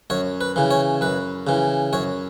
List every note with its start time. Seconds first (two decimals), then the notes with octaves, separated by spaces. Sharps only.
0.10 F#2 C#5
0.41 B4
0.56 C#3 E3
0.71 C#5
1.01 F#2 B4
1.47 C#3 E3
1.93 F#2 C#5